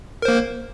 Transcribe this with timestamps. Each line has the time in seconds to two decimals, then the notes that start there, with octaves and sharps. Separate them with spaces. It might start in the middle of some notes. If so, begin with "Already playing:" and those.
0.22 A#4
0.25 C5
0.28 A#3